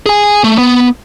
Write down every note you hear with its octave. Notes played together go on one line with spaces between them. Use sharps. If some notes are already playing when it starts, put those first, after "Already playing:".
G#4 G#5
A3
B3